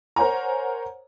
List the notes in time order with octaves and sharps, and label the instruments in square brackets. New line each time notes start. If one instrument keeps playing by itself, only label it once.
[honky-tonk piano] A#4 C5 C#5 F#5 G#5 A#5